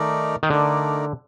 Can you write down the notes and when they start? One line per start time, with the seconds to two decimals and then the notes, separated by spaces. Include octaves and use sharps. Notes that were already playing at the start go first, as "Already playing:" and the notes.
Already playing: D#3 A3 D#4 A#4 D5
0.43 D#3
0.50 D3 A3 D#4 A#4 D5